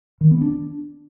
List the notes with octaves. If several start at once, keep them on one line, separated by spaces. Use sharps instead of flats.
D#3
B3
D4